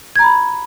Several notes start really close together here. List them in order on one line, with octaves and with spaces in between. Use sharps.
G#6 A#5 B5